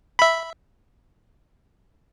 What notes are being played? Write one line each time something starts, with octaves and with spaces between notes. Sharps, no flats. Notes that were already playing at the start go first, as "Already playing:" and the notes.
E5 B5